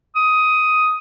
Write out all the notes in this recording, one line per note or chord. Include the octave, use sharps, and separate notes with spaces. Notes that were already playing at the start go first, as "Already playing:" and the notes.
D#6